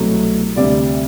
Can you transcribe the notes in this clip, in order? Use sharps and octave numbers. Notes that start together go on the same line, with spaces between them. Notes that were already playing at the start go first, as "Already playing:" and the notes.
Already playing: C2 B2 F#3 A3
D2 C3 G3 D5